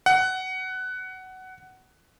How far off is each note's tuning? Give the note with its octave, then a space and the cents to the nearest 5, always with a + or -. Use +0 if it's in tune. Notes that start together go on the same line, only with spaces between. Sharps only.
F#5 +15